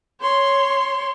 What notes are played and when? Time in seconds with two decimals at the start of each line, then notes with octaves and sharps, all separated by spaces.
0.21 C#5 C6